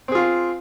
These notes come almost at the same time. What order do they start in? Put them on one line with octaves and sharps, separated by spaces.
C4 G#4 F4